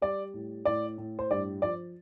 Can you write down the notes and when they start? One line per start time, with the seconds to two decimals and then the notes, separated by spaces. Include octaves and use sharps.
0.02 G3 D5
0.34 A2
0.65 A2 D5
0.98 A2
1.19 C5
1.31 G2 D5
1.62 F3 D5